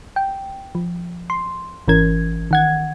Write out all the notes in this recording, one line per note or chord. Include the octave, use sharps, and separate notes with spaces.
G5
F3
C6
G#1 E3 C#4 A#4 G#6
D#3 F#5 G#6